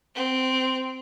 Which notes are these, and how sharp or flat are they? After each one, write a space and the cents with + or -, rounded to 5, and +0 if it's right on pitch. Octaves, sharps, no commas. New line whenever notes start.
C4 -10